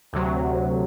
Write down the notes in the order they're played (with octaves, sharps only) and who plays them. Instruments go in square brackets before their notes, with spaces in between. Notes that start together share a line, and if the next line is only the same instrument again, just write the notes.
[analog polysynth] D2 C3 F#3